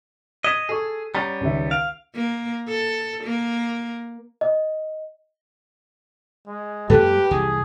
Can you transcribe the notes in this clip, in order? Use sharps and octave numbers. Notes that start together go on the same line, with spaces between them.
D#5 G#6 B6 E7
G#4 A4 C#6
G3 B3 C#4 A#5
C#2 D#3 E5
F5 D7
A#3
A4
A#3
D#5
G#3
F#2 G#3 A#3 G4 A4 B4
C2 F2 E3 G#4